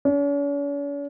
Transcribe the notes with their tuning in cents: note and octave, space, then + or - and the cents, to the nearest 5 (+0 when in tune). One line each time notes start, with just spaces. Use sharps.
C#4 +45